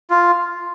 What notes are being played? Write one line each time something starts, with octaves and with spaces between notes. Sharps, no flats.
F4